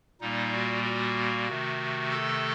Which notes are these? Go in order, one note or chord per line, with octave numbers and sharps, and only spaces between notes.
A#2 G3 A#3 D#4
F#4
F#4
C3 D#3 A3
A4